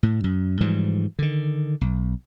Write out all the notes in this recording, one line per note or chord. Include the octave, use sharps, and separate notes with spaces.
A2
F#2
G#2 E3 F3 G3
D3 D#3
B1